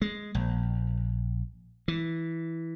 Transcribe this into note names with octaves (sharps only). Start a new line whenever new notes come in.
G#3
A#1
E3